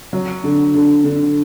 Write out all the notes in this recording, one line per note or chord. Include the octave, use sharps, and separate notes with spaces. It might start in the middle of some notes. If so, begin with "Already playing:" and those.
F#3
D3
D3
D3